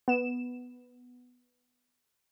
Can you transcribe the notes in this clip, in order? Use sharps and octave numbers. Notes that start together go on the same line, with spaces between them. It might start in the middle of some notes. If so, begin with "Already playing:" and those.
B3 E7